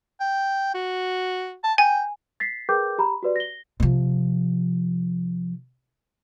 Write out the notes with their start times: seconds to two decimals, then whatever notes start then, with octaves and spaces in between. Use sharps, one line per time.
0.21 G5
0.75 F#4
1.64 A5
1.78 G5 G#5
2.40 A6 B6 C7
2.69 G#4 A#4 B4 G5 D6 G6
2.98 G4 A#5 B5
3.23 F#4 G4 B4 D5
3.36 A#6 G7
3.80 C3 F3